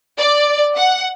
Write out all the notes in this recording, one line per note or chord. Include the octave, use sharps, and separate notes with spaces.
D5
F#5